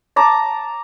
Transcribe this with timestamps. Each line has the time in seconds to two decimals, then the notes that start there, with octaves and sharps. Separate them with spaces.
0.16 A5 A#5 D6